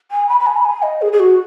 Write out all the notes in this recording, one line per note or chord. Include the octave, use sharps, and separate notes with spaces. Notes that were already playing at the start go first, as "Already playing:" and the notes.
G#5
B5
B5
G#5
B5
G#5
D#5
G#4
G#4
F#4